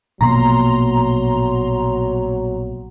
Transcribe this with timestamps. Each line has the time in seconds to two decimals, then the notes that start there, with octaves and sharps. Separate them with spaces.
0.21 A#1 B2 F#3 A#3 A#5 C6